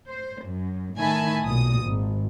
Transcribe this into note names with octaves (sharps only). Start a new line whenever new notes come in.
C5
F#2
A2 D#3 E5 G#5 A5 B5
B1 A#2 D#6
G#1